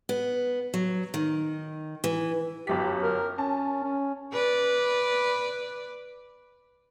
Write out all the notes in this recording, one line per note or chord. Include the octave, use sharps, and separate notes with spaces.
B3
F#3
D#3
E3
G1 F#2 G4 B6
A#4
C#4 A5
C#4
B4 D5